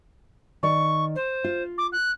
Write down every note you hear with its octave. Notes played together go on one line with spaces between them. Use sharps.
D#3 D5 C#6
C5
F4
D6
F#6